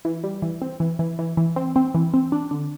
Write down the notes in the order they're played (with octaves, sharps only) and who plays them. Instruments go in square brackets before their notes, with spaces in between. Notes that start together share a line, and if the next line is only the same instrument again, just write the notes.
[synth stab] E3
G3
E3
C4
E3
E3
E3
E3
C4
C4
E3
C4
D4
D3